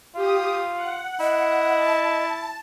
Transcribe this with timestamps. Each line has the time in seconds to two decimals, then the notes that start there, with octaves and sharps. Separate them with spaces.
0.15 F4 G4 D#6
0.75 F#5
1.20 E4 D#5
1.76 A5